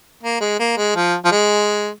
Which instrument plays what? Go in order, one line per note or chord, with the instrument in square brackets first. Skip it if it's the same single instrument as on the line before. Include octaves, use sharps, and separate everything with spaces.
[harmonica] A#3
G#3
A#3
G#3
F3
F3
G#3